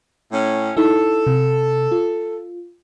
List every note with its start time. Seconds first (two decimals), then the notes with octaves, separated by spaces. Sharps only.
0.32 A2 C#4
0.77 D#4 E4 A4
1.27 C3
1.92 F4